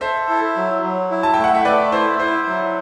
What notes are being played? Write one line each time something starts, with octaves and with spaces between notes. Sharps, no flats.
A4 C5 E5
E4
F#3
F#3
E4
A5
A3 G5
F#5
E5
A3 B4 D5
E4 C5
E4 C5
F#3